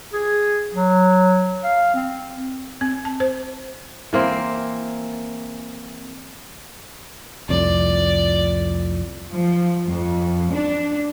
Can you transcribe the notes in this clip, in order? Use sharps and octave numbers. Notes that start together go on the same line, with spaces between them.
G#4
F#3
F5
C4
C4
A5
C5
E3 A#3 C4
C2 F2 A2 D5
F3
F2
D4